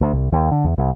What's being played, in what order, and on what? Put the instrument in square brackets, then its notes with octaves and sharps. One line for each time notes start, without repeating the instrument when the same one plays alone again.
[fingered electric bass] D2
C2
D#2
D3
E2
C2